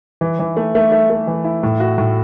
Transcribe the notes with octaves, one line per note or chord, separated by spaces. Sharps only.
E3
E3
A3
A3
A3
A3
E3
E4
A2
F#4
A2